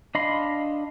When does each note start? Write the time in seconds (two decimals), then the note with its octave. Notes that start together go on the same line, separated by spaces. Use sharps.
0.15 D4 D#5 F5 B5 C6